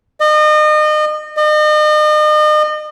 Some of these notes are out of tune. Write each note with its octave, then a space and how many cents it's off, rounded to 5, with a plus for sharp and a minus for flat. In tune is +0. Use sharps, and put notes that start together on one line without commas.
D#5 -35
D#5 -40